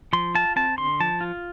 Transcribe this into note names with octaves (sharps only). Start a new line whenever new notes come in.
F3 C6
F4 A5
C4 A5
D3 C6
F3 A5
F4